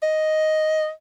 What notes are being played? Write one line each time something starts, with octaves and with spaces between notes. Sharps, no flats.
D#5